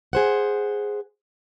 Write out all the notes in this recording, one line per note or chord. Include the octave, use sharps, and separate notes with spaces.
G#4 C5 F#5